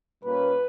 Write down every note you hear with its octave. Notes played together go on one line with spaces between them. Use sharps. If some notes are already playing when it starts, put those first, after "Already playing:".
A#2 G3 A#3 C#4 B4